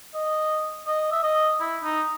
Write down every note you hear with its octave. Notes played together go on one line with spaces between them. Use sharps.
D#5
D#5
E5
D#5
E4
D#4